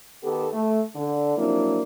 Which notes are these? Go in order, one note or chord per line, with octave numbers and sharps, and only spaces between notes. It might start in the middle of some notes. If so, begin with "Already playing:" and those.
D#3 B3 G4 A4
A3
D3
F3 F#3 A#3 C4 D4 E4